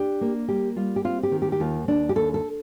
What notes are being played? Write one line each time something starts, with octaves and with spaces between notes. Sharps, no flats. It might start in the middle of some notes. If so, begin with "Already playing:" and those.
Already playing: D4 G4
A#3
G3 G4
G3 F4
G4
C4 F4
G4
D#3
G4
G4
D#2 F4
D#2 D4
G4
D#2 A4
A4